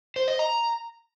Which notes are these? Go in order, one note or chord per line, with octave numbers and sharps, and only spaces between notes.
C5
D#5
A#5